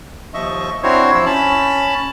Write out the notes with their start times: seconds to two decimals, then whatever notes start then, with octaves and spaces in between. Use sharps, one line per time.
0.34 D#2 F3 D#5 E5 C#6
0.83 C4 D4 E4 F#4 C5 C#5
1.14 F3 E4 E6
1.26 C#4 A5 B5